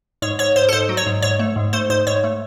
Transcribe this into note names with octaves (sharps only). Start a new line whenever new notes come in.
G#2 C#5
G#2 C#5
G#2 C5
A4
G#2 C5
F#3
C#5
G#2
G#2 C#5
A3
G#2
A3 C5
G#2 C5
G#2 C#5
A3